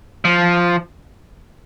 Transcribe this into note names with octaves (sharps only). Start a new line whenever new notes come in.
F3